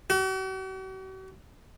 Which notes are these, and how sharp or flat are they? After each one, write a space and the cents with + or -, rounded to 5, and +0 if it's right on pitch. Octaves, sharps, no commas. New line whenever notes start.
F#4 +45